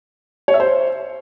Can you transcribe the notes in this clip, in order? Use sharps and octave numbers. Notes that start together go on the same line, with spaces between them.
C#5
E5
C5